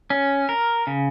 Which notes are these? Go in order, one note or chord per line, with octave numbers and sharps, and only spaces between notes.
C#4
A#4
C#3